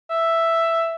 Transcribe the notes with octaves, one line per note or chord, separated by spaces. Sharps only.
E5